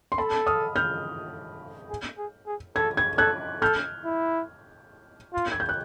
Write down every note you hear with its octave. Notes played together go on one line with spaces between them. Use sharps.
C6
A4 A5 B5
D#6 F6
F6 G6
G#4
G#4
G#4
A4 G#6
G#6
A4 F#6 G#6
A4 F6 G6
E4
F4
G#6
G6
F#6